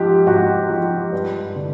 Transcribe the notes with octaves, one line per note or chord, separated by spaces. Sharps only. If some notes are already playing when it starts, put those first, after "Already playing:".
Already playing: G#2 F3 G4
G#2 F#4
F3
G2
D3